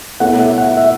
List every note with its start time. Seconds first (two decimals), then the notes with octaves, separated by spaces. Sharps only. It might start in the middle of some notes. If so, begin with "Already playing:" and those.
0.20 B2 A3 E4 A4 C#5 F#5
0.39 E5
0.58 F#5
0.77 E5